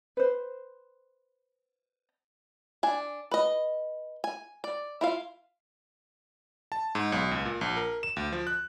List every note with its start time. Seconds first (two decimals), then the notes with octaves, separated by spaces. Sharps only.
0.17 B4 C5
2.83 D4 G#5
3.31 B4 D#5
4.24 G#5
4.64 D5
5.01 E4 F4 F5
6.72 A5
6.95 G#2
7.12 B1
7.31 C#2
7.45 A#2
7.61 A#1
7.77 A#4
8.03 E7
8.16 D2
8.32 F3
8.47 F#6